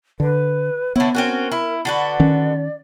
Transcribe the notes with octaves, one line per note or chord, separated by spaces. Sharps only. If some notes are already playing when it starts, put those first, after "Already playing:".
D3 B4
D3 B3 E4 C#5
C4 C#4 F#4 A#4
E4
D3 F#4 B4 D5
D#3 C#4